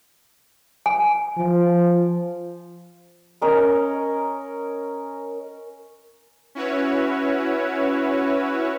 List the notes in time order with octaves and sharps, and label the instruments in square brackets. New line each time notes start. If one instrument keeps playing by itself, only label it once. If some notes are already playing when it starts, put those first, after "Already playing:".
[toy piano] G#5
[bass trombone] F3
[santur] C#4 A#4 D#5
[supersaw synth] C#4 E4 F#4 B4 C#5